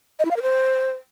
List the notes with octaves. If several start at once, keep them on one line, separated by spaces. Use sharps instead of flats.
D#5
E4
F5
A#4
C5